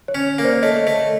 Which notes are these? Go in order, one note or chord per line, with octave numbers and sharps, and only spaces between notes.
C#5
C#4
A#3
C5 D5
A3 C#5 D#5
A3